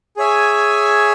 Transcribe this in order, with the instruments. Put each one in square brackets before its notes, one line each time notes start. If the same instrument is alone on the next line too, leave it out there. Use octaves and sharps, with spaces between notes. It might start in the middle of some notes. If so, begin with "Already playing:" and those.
[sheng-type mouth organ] G#4 C#5 E5 G#5